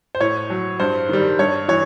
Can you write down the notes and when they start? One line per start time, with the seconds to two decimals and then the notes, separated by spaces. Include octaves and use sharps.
0.15 C5
0.20 A2 C#5
0.50 F#3
0.80 G2 C5
1.09 D#3 G3
1.39 G2 C#5
1.68 E3 C#5